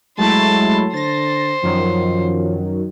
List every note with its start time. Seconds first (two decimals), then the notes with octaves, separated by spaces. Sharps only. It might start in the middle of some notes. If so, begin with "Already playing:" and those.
0.19 F#3 G#3 A3 E4 A5 C6
0.94 D3 C5 A6 A#6
1.64 F#2 D#3 F3 F#3